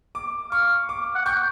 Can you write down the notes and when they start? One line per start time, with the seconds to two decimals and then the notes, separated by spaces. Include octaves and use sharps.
0.15 D6
0.51 F5 C#6
0.89 D6
1.15 F#5
1.25 G5 C#6